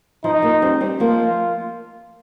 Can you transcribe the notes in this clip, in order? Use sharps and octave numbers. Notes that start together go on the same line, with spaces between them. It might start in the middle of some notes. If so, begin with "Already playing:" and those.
F3 D#4
F3 A#3
G3 C4
G3 C4
F3 A#3 F4